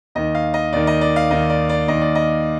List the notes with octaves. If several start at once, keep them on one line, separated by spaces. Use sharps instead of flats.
D#2 D#3 D#5
F5
D#5
D#2 D#3 D5
D#5
D5
F5
D#2 D#3 D#5
D5
D5
D#2 D#3 D#5
D5
D#5